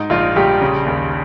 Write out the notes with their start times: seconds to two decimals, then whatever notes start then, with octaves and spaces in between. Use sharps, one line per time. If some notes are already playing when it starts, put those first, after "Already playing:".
Already playing: G#2 D#4
0.10 A#1 F4
0.36 A#1 G3 G4
0.61 C#3
0.86 D#2